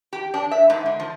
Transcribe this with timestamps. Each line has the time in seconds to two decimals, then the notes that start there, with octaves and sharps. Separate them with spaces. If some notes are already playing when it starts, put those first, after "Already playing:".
0.13 G4
0.34 D4
0.51 E5
0.70 G#2
0.86 D3
1.00 F3